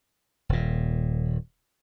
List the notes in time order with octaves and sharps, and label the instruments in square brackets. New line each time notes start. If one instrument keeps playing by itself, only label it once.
[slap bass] D#1 A#2